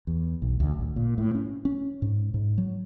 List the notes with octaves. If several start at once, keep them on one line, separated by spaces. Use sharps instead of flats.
E2
B1
D2
A1
A#2
A2
C#4
C#4
G#2
G#2
F#3